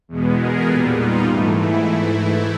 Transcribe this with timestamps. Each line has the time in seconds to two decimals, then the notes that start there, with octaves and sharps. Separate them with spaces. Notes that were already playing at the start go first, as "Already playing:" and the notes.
0.08 E2 B2 G#3 B3
0.38 G#4 A#4
0.66 A#2 G3 B3 A4 B4
0.95 D#4 F4
1.25 G#2 E3 A3
1.54 E4